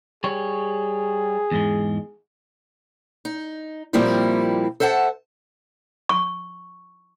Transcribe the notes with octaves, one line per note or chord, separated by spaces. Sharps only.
G3 G#4 C#5
E2 G#2 G#3
D#4
A#2 F3 G3 A#3 C4 E4
A4 C5 E5 F#5 A5
C#6